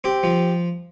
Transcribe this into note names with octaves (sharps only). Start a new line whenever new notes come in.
C4 G4
F3